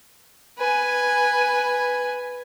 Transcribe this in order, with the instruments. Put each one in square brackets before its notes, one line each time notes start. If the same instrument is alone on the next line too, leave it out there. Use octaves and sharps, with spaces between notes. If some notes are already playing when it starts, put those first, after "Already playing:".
[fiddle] B4 G#5